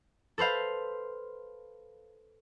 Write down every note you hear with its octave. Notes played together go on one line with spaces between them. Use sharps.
A4 B4 C5 F5